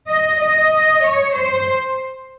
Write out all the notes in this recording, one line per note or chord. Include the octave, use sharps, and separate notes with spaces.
D#5
D#5
C#5
C5